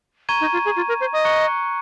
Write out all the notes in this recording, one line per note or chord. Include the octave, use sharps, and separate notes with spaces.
A#5 C#6 G#6 D#7
D#4
F4
G#4
F4
A#4
C5
D#5
A#5 C#6 F#6 C#7